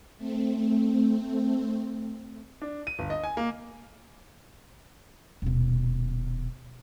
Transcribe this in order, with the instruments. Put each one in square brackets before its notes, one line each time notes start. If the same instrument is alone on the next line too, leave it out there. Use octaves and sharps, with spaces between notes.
[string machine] A3 C4
[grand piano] D4
D#7
G1
D#5
G#5
A#3
[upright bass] D#1 B2